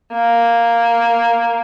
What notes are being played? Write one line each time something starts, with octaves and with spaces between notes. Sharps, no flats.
A#3